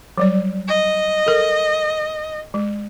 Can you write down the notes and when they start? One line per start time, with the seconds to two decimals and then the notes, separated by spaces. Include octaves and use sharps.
0.18 F#3 G3 D5
0.68 D#5
1.26 A4 A#4
2.54 G#3